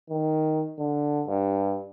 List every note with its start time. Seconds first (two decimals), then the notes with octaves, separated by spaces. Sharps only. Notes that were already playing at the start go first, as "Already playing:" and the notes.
0.10 D#3
0.79 D3
1.27 G2